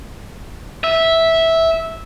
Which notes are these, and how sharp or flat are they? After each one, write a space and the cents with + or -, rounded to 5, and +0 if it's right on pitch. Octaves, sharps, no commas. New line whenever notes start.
E5 -10